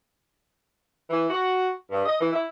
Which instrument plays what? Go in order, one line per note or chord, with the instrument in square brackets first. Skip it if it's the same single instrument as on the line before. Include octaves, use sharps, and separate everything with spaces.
[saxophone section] E3
F#4
G2
D#5
E3
E4